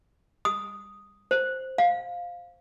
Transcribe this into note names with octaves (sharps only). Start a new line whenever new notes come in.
D#6
C5
F5